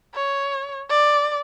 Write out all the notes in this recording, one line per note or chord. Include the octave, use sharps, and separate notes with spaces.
C#5
D5